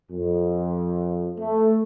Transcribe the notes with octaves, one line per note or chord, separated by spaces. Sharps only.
F2
A3